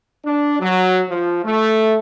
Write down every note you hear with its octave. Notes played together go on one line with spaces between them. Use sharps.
D4
F#3
F3
A3